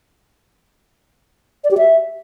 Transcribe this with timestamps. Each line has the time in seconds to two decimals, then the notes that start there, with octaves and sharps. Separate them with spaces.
1.64 D5
1.71 G4
1.78 E5